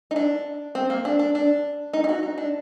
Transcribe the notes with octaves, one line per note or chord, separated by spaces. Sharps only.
D#4
D4
C4
A#3
D4
D4
D4
D#4
D#4
F#4
D#4
D4